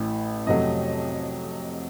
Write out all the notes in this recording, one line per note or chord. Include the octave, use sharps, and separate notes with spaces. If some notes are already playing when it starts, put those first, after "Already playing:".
Already playing: A1 A2 A3
F2 C3 F#3 A3 D#5